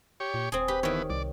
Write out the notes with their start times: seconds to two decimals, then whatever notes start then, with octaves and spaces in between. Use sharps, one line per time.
0.20 G4 C#5
0.34 A#2
0.52 D#1 C4 G#4
0.68 G4 B4
0.83 D#3 E3 B3 C#5
1.10 C2 D5